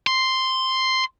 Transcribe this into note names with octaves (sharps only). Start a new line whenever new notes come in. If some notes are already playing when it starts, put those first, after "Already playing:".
C6